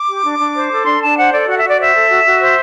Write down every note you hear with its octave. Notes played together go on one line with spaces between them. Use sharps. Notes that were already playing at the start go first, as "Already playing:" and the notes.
Already playing: D6
G4
D4
D4
C5
A4
D4 C6
D4 A5
C5 F#5
A4 D5
F#4 F#5
F#4 E5
D5
C5 E5
A4
F#4
F#4
C5